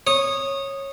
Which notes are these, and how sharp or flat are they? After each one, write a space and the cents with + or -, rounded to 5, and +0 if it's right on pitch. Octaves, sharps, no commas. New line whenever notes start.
C#5 -15 D#6 -10